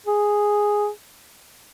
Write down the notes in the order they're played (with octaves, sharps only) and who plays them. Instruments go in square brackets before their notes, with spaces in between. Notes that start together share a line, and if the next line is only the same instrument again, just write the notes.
[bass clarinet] G#4